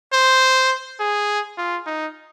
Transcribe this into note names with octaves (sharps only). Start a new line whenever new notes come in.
C5
G#4
F4
D#4